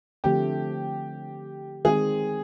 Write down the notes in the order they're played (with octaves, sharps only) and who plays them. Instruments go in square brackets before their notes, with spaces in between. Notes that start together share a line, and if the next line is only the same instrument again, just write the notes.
[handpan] D3 F3 A3 C4 [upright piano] G4
[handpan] D#3 G#3 C4 [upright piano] G#4